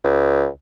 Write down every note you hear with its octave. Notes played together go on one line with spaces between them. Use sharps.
C#2